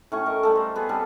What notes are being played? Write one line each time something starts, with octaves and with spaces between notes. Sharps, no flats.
A2 C#4 C#6
A#4 D#5
G3 A3 A4
C5 A#5
B3 G#4 A4
G3 C4 A4